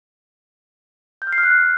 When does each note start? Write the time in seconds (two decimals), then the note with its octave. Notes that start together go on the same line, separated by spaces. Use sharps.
1.22 G6
1.27 F6
1.33 C7
1.38 F6
1.43 F#6